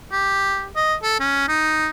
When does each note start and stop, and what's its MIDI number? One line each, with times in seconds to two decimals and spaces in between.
0.12 0.66 67
0.77 0.95 75
1.03 1.17 69
1.20 1.45 61
1.48 1.89 63